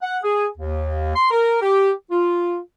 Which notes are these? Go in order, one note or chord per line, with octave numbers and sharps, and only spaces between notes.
F#5
G#4
D#2
C6
A#4
G4
F4